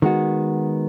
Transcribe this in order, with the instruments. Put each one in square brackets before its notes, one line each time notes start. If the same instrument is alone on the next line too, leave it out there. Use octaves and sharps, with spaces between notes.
[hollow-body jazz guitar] D#3 G#3 B3 F#4